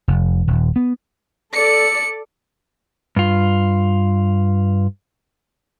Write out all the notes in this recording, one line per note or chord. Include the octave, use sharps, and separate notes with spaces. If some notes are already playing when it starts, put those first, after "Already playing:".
F1
D#1
B3
A4 D5 C#7
G2 F4